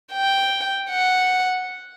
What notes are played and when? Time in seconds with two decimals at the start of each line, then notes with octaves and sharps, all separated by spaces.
0.13 G5
0.90 F#5